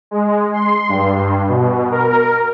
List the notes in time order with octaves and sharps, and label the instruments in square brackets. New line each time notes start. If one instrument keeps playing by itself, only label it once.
[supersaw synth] G#3
C6
G2
B2
A#4